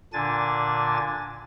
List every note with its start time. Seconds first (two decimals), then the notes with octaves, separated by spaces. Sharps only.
0.13 A#2 D3 D4 G#5 A6